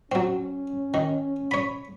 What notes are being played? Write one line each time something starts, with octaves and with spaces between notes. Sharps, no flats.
F#3 C4 C#4
D#3
C#5 B5